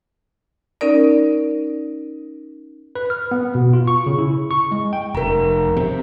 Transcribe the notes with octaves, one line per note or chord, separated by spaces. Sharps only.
C#4 D#4 A#4 D5
B4
F6
B3
B2
F4
C#6
C#3
E4
C#6
G#3
G5
F1 A#4 A#5
C3